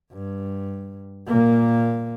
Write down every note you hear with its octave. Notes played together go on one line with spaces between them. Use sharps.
G2
A#2 A#3